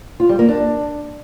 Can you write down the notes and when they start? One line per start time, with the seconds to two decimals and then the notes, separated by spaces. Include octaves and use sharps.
0.20 F4
0.29 G3
0.39 A#3
0.49 D4